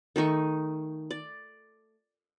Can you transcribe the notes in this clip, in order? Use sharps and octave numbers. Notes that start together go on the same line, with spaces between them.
D#3 A3 D#4 C#6
D5